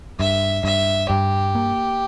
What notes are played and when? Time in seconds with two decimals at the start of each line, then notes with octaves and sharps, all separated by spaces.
0.20 G2 E5
0.64 G2 E5
1.09 G2 G4
1.55 A#3